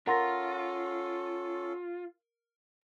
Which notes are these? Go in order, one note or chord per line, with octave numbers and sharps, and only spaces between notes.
C#4 F4 A4 A#4 F#5 C6 A#6